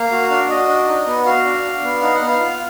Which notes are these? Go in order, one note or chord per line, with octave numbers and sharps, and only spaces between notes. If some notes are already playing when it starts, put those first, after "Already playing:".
Already playing: A#3 F5
F#4
D4
F#4 D#5
D4
D#4
B3
F#4 F5
D4
D4
B3
D#4 F5
F#5
B3
F5
F4